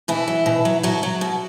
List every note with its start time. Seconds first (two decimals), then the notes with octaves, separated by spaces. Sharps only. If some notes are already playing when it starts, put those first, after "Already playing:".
0.08 B2 E3 E4
0.28 F#3
0.46 B2
0.65 F#3
0.83 B2 F#3 F#4
1.03 F#3
1.21 B2